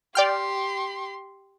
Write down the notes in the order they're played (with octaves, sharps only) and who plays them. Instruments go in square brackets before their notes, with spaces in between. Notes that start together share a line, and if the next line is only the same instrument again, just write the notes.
[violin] G4 C6 [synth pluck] D5 G5 F6